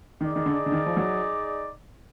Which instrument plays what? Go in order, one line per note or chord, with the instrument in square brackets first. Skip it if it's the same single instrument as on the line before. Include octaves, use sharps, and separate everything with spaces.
[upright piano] D#3 [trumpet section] D#4 G#4 D5
[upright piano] D#3
D3
D3
D#3
F3
F#3